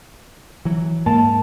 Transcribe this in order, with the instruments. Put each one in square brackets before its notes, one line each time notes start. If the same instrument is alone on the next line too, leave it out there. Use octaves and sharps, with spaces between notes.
[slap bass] E3 F#3
[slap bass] G#2 [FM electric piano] A#3 [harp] A5